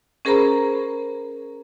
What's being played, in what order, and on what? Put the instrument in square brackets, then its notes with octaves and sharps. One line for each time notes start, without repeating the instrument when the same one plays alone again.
[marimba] C#4 G#4 A#4 C5 A#5 B5